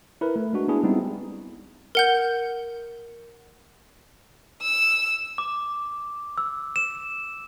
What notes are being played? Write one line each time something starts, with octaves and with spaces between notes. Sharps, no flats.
E4 A#4 B4
A3
G#3 D4 F#4
B3 D4 E4 G#4
G3 G#3 B3 C4 D#4 E4
A#4 F#5 G6
E6
D6
E6
E7